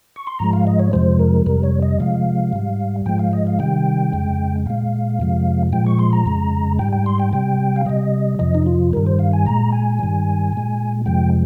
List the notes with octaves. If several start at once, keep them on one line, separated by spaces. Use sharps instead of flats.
C#6
C6
G#2 F3 G#3 A#5
F5
D#5
C#5
F2 C3 F3 G#3 C5
A#4
F2 C3 G3 A#4
C#5
D#5
C3 F3 G#3 F5
G#2 G3
G#2 F3 G#3 G5
F5
D#5
F5
C3 D#3 G3 G5
F2 C#3 G#3
A#2 G#3 F5
F2 C3 F3 G#3
A#2 F3 G#3 G5
C#6
C6
A#5
F2 C#3 G#3
G#2 G3 G5
G5
C6
G5
C3 G3 G5
F5
C3 G3 D#5
F2 C3 F3 D#5
D#4
F4
G2 D#3 G3 A#4
C5
F5
G#5
A#2 G#3 A#5
G#5
G2 D#3 G3
A#2 G#3
F2 C3 F3 G#3 G5